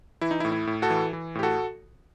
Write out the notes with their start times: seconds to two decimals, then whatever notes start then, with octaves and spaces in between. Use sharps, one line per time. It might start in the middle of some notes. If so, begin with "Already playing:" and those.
0.21 E3 E4
0.31 D#4
0.40 E4
0.45 A2
0.52 E4
0.67 A2
0.82 F#4 A4
0.90 E3
1.13 E3
1.35 A2 G4
1.43 F#4 A4